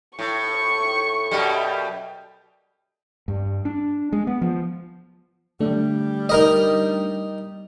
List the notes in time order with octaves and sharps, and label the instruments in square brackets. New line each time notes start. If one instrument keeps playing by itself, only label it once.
[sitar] A2 [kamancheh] C#6
[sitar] F#2 B2 G3
[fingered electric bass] G2
D4
G#3
B3
F3
[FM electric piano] D3 A3 D4 [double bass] G3
[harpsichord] D#4 A#4 D#5